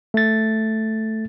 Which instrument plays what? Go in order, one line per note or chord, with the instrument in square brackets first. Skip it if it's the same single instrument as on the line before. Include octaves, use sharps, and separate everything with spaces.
[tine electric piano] A3 A6